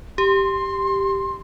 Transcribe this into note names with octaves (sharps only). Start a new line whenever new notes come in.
G4 C6